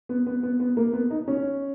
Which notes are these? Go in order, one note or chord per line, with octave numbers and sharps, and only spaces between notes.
B3
B3
B3
B3
A#3
B3
D#4
C#4